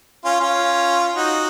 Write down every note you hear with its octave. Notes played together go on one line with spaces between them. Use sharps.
C#4 F4
C#4 F4
D#4 F#4